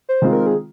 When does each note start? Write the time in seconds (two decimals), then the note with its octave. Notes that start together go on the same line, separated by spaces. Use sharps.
0.09 C5
0.22 D#3 G#3 C4 F4
0.33 A#4
0.47 G#4